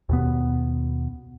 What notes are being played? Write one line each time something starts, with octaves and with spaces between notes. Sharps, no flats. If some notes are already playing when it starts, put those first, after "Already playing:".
D#2 B2 B3